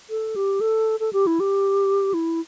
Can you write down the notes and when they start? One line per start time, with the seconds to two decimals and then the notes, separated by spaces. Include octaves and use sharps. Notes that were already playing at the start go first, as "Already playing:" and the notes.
0.10 A4
0.36 G4
0.61 A4
1.00 A4
1.13 G4
1.27 E4
1.40 G4
2.14 E4